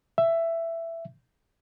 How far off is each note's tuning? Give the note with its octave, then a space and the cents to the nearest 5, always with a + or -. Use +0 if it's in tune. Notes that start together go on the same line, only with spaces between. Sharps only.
E5 +10